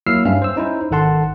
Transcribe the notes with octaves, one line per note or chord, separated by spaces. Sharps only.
F#3 A#3 E4 E6 F6 C7
G2 C#4 E5 F5 F6
C5 E6
C#4 D#4 E4 C5
G#1 D#3 A4 F#5 A5 C6